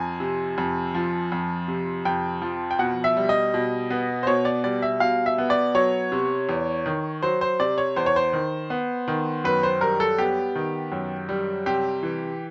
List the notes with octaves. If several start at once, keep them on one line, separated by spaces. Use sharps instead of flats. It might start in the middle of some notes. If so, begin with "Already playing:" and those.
Already playing: F2 G#5
C3
F2
F3
F2
C3
F2 G5
F3
G5
B2 F#5
E5
G3
D#5
B2
B3
C5
B2 C#5
D5
G3 D5
E5
B2 F5
E5
B3
D5
F#3 C#5
C3
E2
D#3
F#3 C5
C5
C3 D5
C#5
E2 C5
C#5
C5
D#3
B3
D#3
F#2 B4
C5
G3 A#4
A4
B3 G4
D#3
F#2
G3
C3 G4
E3